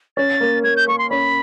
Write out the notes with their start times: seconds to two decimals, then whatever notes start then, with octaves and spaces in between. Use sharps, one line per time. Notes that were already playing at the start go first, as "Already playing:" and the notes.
0.17 C#4 A6
0.41 A#3
0.64 A#3 G#6
0.76 G6
0.88 A#3 C#6
0.98 C6
1.10 C#4 B5